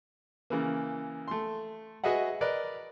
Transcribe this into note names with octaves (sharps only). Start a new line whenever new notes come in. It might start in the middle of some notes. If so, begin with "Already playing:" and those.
C#3 E3 A#3
A3 C6
F#4 G#4 B4 D#5 E5 F#5
A#4 B4 D5 D#5